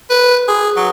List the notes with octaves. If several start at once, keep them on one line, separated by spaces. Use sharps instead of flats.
B4
G#4
F#3